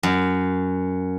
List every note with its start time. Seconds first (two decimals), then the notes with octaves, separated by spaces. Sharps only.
0.03 F#2